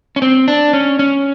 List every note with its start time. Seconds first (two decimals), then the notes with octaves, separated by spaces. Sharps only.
0.16 C#4
0.22 C4
0.48 D4
0.73 C#4
0.99 C#4